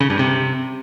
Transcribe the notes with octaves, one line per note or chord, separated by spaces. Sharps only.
C#3
G2
C3